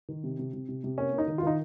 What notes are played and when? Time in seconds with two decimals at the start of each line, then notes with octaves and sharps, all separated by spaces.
0.09 D#3
0.24 C3
0.39 C3
0.53 C3
0.69 C3
0.84 C3
0.98 A#3 C#4
1.13 A#3
1.18 D#4
1.28 D#3
1.38 F4
1.43 D#3 D#4